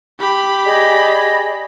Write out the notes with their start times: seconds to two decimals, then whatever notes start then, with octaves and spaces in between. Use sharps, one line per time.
0.20 G4 B5
0.64 G#4 D5 D#5